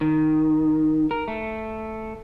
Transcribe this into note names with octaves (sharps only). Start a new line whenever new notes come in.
D#3
A#4
A3